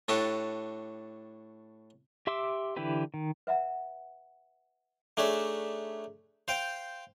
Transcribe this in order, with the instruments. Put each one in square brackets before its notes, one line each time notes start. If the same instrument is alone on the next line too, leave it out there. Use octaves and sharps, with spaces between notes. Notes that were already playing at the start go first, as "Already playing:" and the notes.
[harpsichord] A2 D4 F#4 G4 A4
[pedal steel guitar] G4 E5 C6 D6 E6
D3 E3 E4 G4 B4
D#3
[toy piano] B4 E5 F#5 A#5
[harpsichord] A3 D4 D#4 G#4 C#5 E5
C5 F5 G5